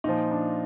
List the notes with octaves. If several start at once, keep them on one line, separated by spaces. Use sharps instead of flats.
A#2 F3 D#4
D4